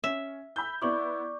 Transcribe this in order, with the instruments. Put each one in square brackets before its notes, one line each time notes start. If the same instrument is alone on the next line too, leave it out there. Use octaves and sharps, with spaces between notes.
[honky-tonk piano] C#4 [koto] E5
[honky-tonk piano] B5 E6 G6
[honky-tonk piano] B3 E4 [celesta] D5 C#6 D6